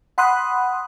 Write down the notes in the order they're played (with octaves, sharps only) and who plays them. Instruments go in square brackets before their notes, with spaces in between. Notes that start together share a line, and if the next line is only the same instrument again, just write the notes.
[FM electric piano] F#5 B5 C6 D#6 F#6